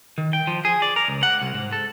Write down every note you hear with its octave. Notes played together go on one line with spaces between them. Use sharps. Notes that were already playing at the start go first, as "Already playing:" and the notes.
D#3
G5
F3
G#4
D5
A#4
C#2
F#5
C2
G#2
A4